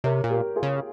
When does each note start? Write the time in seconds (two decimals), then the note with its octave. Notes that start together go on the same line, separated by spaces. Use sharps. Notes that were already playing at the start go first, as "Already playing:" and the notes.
0.04 C3 A#4 C#5
0.24 A#2
0.30 G4 A#4
0.56 F4 G#4
0.63 C#3